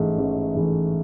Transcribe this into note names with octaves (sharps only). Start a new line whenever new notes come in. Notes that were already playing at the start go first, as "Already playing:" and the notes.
Already playing: A1 G#2 E3 A3
A1
G#2 E3 A3